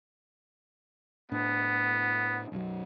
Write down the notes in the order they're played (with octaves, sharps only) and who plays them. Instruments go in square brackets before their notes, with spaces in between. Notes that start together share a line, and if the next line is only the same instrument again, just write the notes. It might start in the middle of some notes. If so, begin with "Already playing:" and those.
[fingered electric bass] A2 D4 [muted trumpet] B3
[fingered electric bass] B1 F#2 F#3